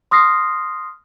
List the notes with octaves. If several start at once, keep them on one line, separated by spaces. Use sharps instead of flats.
C6 D#6 F6 A#6 C7